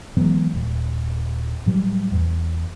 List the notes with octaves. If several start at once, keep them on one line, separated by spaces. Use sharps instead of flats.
E3 F#3 G#3 B3
D#1
A2 F#3 G3
E2